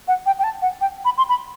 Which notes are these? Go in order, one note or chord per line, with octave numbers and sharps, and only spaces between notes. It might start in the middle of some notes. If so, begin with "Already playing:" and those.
F#5
G5
G5
A5
F#5
G5
B5
C6
B5